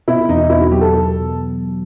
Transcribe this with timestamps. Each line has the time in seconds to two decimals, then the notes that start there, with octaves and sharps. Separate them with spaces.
0.08 B2 E4
0.29 E2 D#4
0.50 B3 E4
0.60 F#4
0.71 F#3 G4
0.81 A4
0.92 B2